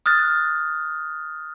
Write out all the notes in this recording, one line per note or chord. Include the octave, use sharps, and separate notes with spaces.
D#6 F6 F#6 A6